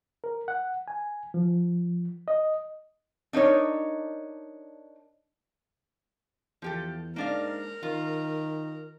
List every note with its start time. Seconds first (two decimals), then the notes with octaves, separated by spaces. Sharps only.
0.24 A#4
0.48 F#5
0.88 G#5
1.34 F3
2.28 D#5
3.33 D4 D#4 A#4 C#5
6.62 E2 F3 G4 A4
7.16 G#2 A#3 D4 A#4 F5
7.83 D#3 F4